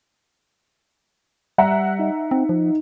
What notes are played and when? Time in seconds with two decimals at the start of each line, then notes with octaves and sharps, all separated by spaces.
1.58 G3 E5 F#5 A#5 F#6
1.99 D#4
2.31 C4
2.49 F3